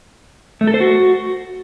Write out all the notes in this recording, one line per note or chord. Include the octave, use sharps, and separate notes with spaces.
A3
A4
C5
F#4